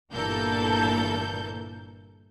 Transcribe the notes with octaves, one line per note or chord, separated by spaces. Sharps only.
G1 A#2 E3 A4 A#4 G6